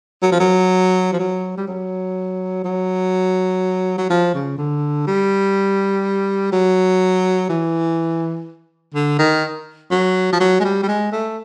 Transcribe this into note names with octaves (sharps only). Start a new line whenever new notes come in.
F#3
F3
F#3
F3
F#3
G3
F#3
F#3
F#3
F3
C#3
D3
G3
F#3
E3
D3
D#3
F#3
F3
F#3
G#3
G3
G3
G#3
A3